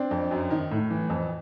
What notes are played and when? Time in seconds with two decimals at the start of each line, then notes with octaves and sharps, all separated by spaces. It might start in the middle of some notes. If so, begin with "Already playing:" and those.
Already playing: C4 D4
0.11 F2
0.31 F#2
0.50 D#3
0.71 A2
0.90 E3
1.10 F2